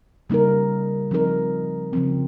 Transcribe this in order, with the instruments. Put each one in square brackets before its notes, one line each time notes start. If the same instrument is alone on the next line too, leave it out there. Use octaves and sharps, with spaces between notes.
[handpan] C#3 G3 A#3 D#4 A#4
F3 C4 D#4 A#4
C#3 F3 C4